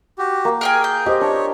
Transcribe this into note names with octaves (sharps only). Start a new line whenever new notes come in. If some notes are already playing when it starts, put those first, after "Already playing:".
F#4 G4
A#3
G#4 A#4 G5 G#5
G6
G4 C5 D#5
D4 C#5